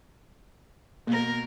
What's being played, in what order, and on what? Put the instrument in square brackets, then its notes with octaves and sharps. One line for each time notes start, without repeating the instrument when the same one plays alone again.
[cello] B2 A#4 [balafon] A#3